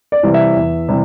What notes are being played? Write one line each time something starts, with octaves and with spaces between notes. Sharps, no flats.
D5
C3 E3 G3
E5
E2
C3 E3 G3